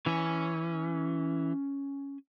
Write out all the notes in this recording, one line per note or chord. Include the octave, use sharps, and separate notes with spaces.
E3 C#4 G#5